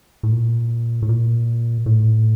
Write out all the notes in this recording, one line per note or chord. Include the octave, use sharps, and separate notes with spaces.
A2
A#2
A2
A#2
A2